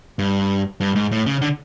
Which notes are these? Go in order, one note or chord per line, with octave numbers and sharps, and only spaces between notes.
G2
G2
G#2
A2
C#3
D3